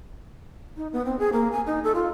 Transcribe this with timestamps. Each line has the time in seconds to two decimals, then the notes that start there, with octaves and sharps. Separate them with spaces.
0.77 D#4
0.93 B3
1.05 C4
1.19 G#4
1.32 A#3
1.52 G#5
1.66 D#4
1.84 A4
1.95 F4